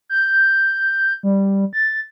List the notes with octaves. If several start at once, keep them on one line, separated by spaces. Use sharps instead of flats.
G6
G3
A6